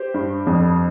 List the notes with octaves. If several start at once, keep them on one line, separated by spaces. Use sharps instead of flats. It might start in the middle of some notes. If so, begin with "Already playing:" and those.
Already playing: G4 C5
G2
F2